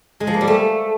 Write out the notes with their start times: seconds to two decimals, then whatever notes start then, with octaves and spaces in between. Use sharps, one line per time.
0.20 G#3
0.27 F3
0.34 A#3
0.41 G3
0.48 A3